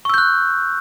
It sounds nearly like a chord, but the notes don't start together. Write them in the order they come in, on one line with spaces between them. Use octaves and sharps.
C#6 E6 G6 F#6